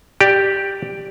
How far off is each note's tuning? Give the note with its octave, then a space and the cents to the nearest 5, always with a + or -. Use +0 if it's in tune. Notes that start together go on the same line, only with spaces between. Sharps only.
G4 +0 D5 +10